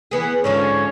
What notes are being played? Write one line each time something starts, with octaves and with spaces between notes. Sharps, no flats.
E3 B3 G#4
G#2 D3 F3 C#4 C#5